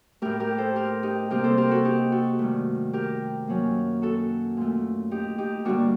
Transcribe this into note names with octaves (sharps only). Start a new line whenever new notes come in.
A2 A3 G4 A#4
G4 A#4
A4 C5
G4 A#4
D#4 G4
C3 G3 A#3 G4 A#4
A4 C5
G4 A#4
F#4 A4
D#4 G4
F#4 A4
G2 D#3 A3
G4 A#4
F#2 F#3 A#3
F#4 A4
A#2 A3
D#4 G4
D#4 G4
G2 D3 G3 A#3 D4 F#4